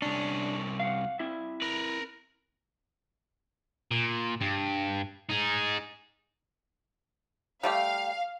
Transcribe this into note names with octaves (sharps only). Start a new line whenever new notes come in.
C2 C#4 D4
F5 F#5
C4 E4 E5
A#4 B4
A#2
G2
D#4 G#4
G3 A3 G4 F5